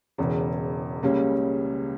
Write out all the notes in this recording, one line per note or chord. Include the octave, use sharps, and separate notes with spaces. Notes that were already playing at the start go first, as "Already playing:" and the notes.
E1 E2 C#3
C#2 C#3 G3 A#3 C#4